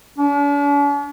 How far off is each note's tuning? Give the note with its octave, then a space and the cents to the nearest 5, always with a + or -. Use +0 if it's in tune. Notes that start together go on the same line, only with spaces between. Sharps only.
D4 -45